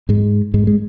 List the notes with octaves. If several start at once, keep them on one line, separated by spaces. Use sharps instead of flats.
G#2 G#3
G#2 G#3
G#3